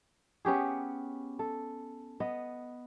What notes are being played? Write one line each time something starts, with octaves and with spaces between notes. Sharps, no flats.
B3 C#4 G4 G#4
A4
B3 D#5